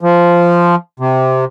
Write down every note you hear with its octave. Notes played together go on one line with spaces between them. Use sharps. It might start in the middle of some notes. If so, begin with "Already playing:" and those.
F3
C3